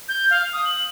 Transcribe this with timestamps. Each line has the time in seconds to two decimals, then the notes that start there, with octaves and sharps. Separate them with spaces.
0.08 G6
0.30 F5
0.53 D#6
0.65 F#7